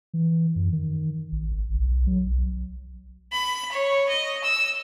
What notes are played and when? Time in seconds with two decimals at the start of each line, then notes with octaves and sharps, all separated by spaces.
0.14 E3
0.56 F#2
0.72 D#3
1.32 A1
1.52 G#1
1.74 B1
2.07 F#3
2.26 B1
3.33 B5
3.72 C#5
4.08 D#5
4.44 E6